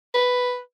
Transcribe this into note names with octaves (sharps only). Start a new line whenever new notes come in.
B4